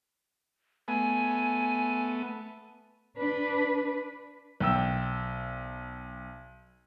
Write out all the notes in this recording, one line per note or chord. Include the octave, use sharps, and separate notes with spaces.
A3 B3 G#5
D4 B4
B1 G5 E6